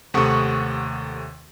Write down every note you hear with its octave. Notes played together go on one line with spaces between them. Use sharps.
D#2 C3 A3 F#5 C#6 D#6